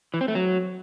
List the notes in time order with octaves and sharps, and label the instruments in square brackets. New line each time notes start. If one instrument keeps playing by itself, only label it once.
[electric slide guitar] E3
C4
A3
F#3